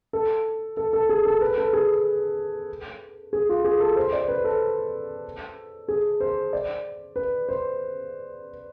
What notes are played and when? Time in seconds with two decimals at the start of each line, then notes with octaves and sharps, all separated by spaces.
0.13 A4
0.77 A4
0.93 A4
1.09 G#4
1.25 A4
1.41 B4
1.58 A4
1.73 G#4
3.33 G#4
3.49 F4
3.64 G#4
3.80 A4
3.96 C5
4.13 D5
4.28 B4
4.44 A4
5.88 G#4
6.20 C5
6.53 D5
7.16 B4
7.49 C5